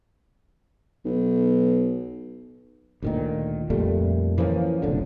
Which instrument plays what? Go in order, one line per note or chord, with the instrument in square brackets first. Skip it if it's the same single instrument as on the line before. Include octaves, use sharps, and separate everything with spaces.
[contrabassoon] B1
[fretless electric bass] D2 A#2 D#3
F2 A#2 G3 A3
E3 F3 A#3 C#4
F1 B1 A2 D3